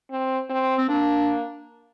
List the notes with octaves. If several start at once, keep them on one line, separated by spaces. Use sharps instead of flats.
C4
C4
C4
A#3 D4